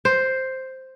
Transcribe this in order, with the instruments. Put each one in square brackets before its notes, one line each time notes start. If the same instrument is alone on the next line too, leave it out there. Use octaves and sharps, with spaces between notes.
[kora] C5